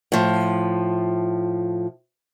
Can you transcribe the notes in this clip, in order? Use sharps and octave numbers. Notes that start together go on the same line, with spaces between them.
A2 F3